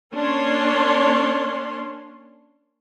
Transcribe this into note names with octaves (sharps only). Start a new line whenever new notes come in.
A#3 C#4 D4 C#5 C6